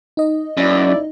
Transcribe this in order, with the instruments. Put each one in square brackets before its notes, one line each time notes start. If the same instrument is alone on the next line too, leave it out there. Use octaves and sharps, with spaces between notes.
[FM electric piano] D#4 D#5
[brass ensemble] F#1 E4 D5 [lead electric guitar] F#2